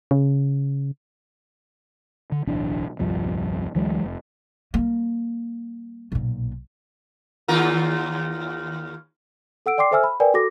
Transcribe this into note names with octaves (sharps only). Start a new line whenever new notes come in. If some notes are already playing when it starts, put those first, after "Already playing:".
C#3
D3
D1 B1 E3 D4
D#1 C2 G2 F3
D2 E3 F#3 G#3
F1
G3 A#3
B1 A#2
D#2 F4 A#4
A4 F#5 E6 D7
D5 G5 C6 D6 C7
A4 C5 E5 G#5 E6 F6
B5
A#4 B4 D5 G5 G#5
F#4 A4 D6 A#6